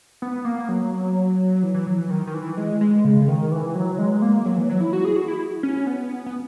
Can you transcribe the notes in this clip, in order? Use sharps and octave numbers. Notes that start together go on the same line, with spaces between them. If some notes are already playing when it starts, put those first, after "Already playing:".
B3
A#3
F#3
E3
E3
F#3
E3
D#3
D#3
E3
G#3
G#3
C#3
C#3
D#3
E3
F#3
G#3
A#3
F#3
E3
F#3
E4
F#4
G#4
F#4
E4
C#4
B3
B3